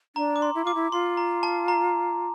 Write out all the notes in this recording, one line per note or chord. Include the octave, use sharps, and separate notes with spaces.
D4 A#5
D6
C6
E4
F4 D6
E4
F4 C6
A#5
A5
A#5